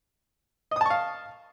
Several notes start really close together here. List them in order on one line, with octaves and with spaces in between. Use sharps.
D#5 D#6 A5 C#6 F5